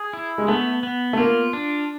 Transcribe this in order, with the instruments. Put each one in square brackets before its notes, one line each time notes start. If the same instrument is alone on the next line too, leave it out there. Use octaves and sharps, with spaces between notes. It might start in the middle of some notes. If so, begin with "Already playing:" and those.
Already playing: [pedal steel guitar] G#4
E4
[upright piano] G#3
[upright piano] A3 [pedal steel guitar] B3
[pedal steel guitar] B3
[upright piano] A3
[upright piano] A#3 [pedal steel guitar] F4
[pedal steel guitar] D4